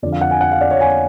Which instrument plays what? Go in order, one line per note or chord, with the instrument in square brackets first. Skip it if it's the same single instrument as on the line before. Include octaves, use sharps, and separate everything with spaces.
[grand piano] F2 D3 F3 D5
F5
F#5
G#5
F#5
F5
D5
C#5
G#5